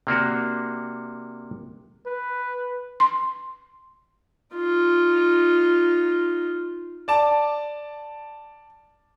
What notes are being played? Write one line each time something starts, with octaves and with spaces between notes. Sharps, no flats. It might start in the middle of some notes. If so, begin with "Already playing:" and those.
C3 A#3 D4 F#4
B4
C6
D#4 F4
D5 A5 D6